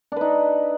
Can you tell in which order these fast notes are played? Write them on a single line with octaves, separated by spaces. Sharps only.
D4 B4 D#4